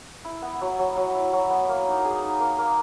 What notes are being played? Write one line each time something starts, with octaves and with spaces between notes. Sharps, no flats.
E4
B3
F#3
F#3
F#3
E4
F#3
B3
A#3
D#4
G#4
D#4
A#3
A#3